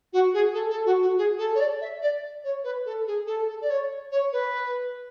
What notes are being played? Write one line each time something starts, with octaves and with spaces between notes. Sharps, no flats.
F#4
G#4
A4
A4
F#4
F#4
G#4
A4
C#5
D5
E5
D5
C#5
B4
A4
G#4
A4
A4
D5
C#5
C#5
B4